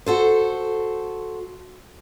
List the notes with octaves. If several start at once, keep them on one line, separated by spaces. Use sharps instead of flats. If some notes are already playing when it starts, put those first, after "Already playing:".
F#4 A4 C5